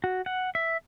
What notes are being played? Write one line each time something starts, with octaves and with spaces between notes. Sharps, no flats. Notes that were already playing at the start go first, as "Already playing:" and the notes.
F#4
F#5
E5